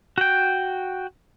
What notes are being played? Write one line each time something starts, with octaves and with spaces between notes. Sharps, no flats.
F#4 G5